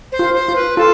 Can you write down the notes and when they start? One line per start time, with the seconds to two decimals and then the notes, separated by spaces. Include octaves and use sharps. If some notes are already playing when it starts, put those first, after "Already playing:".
0.12 C5
0.19 F4
0.34 C5
0.49 F4
0.56 B4
0.77 F4 A4